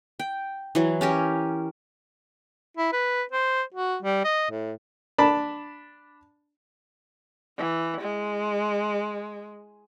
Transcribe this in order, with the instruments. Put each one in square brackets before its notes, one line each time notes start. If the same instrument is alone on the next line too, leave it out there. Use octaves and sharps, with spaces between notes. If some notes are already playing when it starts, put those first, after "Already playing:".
[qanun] G5
E3 F#3
C#4 G4 A#4
[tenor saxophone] E4
B4
C5
F#4
G3
D#5
A2
[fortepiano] D4 A5 B5
[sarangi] E3
G#3